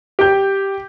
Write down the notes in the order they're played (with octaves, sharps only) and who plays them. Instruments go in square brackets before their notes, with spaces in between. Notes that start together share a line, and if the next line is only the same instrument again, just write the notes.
[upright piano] G4 G6